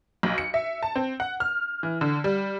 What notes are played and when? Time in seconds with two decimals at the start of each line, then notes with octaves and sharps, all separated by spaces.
0.23 B1
0.38 C#7
0.54 E5
0.83 A5
0.96 C4
1.20 F#5
1.40 F6
1.83 E3
2.01 D3
2.24 G3